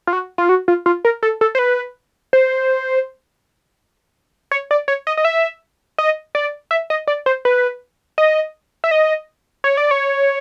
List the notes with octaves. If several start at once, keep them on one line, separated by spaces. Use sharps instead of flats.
F4
F#4
F4
F#4
F4
F4
A#4
A4
A4
C5
B4
C5
C#5
D5
C#5
D#5
D#5
E5
D#5
D5
E5
D#5
D5
C5
B4
D#5
E5
D#5
C#5
D5
C#5